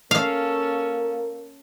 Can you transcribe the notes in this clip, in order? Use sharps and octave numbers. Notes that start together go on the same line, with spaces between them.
A#3 C#4 A4 F5